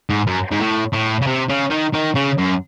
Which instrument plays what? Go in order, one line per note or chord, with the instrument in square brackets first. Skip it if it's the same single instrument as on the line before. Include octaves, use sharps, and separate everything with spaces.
[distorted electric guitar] G#2
F#2
G#2
A2
A2
C#3
C3
C#3
D#3
D#3
C#3
F#2